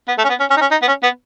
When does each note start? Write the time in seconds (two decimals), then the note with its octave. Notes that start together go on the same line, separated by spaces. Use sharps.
0.08 B3
0.18 A3
0.24 C#4
0.29 B3
0.40 C#4
0.50 C#4
0.57 D#4
0.61 C#4
0.71 D#4
0.82 B3
0.88 C#4
1.03 B3